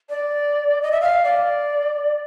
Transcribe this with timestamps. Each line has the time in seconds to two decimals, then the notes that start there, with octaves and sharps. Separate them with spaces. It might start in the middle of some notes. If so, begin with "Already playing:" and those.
0.09 D5
0.82 D#5
0.92 E5
1.01 F5
1.24 D5